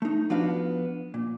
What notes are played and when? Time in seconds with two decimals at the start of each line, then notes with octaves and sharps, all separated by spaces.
0.02 A3 D#4
0.30 F3 B3 D4 F#4 F5
1.14 A#2